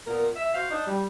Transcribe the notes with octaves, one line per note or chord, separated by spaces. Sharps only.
A#2 B3 A#4
E5
F#4 C5 F5
D4 D#4
G3